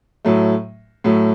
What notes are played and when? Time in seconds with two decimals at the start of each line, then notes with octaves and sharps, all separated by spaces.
0.25 A2 F#3 A3
1.04 A2 F#3 A3